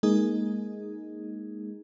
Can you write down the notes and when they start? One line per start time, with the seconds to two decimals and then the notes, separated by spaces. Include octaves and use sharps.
0.03 G#3 A#3 D#4 G#4 D#5